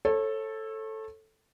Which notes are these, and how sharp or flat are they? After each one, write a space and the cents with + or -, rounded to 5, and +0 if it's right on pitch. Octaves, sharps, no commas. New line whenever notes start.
A4 +0 C#5 -30